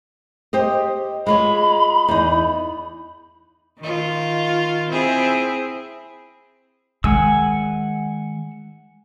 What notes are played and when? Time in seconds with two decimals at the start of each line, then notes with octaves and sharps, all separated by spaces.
0.53 G4 C5 D#5
1.27 G#3 F4 C#5 B5
2.08 E2 D#4
3.80 D#3 F4
4.89 C4 E4 G#4
7.04 D#3 G#3 F#5 G#5 E6